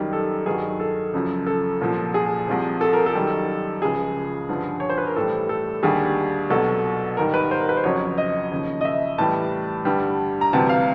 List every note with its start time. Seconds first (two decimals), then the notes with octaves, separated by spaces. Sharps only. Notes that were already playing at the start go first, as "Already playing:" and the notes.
Already playing: F#2 D#3 G3
0.13 A4
0.46 G2 D#3 F#3 G#4
0.80 A4
1.13 F#2 C#3 F3
1.47 A4
1.81 C2 A#2 F3
2.14 G#4
2.48 C2 C3 F3
2.81 A4
2.93 A#4
3.06 A4
3.15 F#2 D#3 G3
3.82 C#2 C#3 F3 G#4
4.49 G2 D3 F3
4.80 C#5
4.90 C5
4.98 B4
5.07 A#4
5.16 A2 E3 G3 A4
5.49 A4
5.83 D#2 D3 G3 G#4
6.50 C2 B2 F#3 A4
7.17 G#2 D#3 G3 A#4
7.34 B4
7.51 C5
7.60 A#4
7.69 B4
7.77 C5
7.84 F2 C#3 F#3 C#5
8.18 D#5
8.52 D#2 C#3 F3
8.81 D#5
8.85 E5
9.18 A2 E3 G3 A5
9.85 G2 D3 G3
10.41 A#5
10.53 D2 C3 E3 G3 A5
10.69 F5